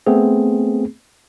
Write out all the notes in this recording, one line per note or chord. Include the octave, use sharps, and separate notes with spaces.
A3 B3 C4 G#4